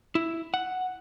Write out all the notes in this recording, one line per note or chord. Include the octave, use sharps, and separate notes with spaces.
E4
F#5